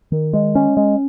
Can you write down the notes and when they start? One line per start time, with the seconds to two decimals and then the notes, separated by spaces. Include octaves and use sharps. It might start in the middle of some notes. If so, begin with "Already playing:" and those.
0.12 D#3
0.33 G#3
0.55 C#4
0.77 G#3